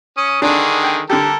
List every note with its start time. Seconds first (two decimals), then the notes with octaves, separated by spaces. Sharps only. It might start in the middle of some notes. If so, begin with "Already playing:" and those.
0.17 C#4 D#6
0.42 D3 D#3 D4 G#4
0.84 G5
1.10 D3 G4 A4 A#4